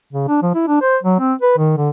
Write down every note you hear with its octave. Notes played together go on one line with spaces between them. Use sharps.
C#3
D4
F3
E4
D4
C5
F#3
C4
B4
D#3
D3